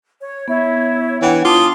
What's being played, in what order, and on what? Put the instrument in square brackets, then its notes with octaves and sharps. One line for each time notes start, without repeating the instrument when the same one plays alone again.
[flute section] C#5
[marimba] B3 [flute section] E4 C#5
[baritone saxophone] E3 [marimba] D4 C#5 [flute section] F#5 G5
[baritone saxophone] F4 [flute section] A5 D#6 [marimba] D6